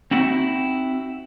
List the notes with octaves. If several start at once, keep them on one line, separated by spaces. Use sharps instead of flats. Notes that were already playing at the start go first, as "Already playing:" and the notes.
C4 D#4 E4 F#4 F#5